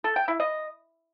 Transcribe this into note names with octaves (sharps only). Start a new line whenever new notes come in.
A4
G5
E4
D#5